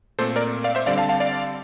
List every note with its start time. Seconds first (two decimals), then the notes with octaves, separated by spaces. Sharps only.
0.19 A#2 A3 C4 A4 C5
0.36 A#4 D5
0.64 D5 F5
0.75 C5 E5
0.86 D3 G3 C4 D5 F5
0.98 F5 A5
1.09 F5 A5
1.20 D5 F5